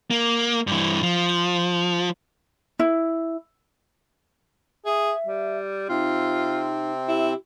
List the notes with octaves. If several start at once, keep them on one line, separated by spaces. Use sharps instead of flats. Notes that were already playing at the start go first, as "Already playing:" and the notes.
A#3
G2 E3
F3
E4
G#4 E5
G3
C3 C4 D#4 F4
E4 G4